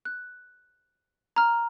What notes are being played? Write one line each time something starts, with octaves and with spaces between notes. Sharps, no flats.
F#6
A#5 F6